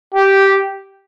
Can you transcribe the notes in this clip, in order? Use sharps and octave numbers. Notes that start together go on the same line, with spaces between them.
G4